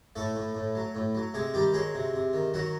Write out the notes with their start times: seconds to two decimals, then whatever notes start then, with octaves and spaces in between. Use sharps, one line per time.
0.16 A2 A3 A4
0.35 A2
0.55 A2
0.75 F#3
0.95 A2
1.15 F#3
1.34 C3 G#3 G#4
1.54 D#3 G3 G4
1.74 F#3 G#3 G#4
1.94 C3
2.14 C3
2.33 D#3
2.54 D#3 F#3 F#4